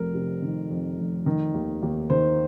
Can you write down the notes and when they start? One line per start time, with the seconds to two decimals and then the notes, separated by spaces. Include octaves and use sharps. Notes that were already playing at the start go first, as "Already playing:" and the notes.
Already playing: F1 F2 A#4
0.14 C3
0.42 D#3
0.71 F2
0.98 F1
1.26 D#3
1.54 D#2
1.82 D#2
2.10 D#3 C5